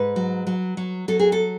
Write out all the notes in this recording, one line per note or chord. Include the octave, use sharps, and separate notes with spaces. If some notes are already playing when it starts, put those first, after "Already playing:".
Already playing: G#2 B4
F#3
F#3
F#3
F#3 A4
G#4
A4